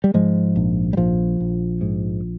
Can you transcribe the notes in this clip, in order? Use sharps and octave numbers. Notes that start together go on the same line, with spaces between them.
G3
G#2 F3 G#3
A#1
G3
A#1 F3
A#1
G#2